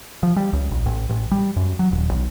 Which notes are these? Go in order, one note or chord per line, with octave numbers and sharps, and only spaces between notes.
F3
G3
C#2
A#1
A1
A1
G3
F#2
F#3
D#1
B1